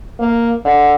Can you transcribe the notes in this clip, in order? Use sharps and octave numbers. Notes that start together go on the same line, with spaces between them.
A#3
D3